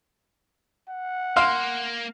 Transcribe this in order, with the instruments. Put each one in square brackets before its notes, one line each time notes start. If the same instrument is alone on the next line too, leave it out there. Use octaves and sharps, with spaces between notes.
[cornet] F#5
[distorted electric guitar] A#3 [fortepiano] F5 [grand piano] C6